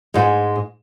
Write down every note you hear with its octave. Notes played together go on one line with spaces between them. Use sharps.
G#2 G#3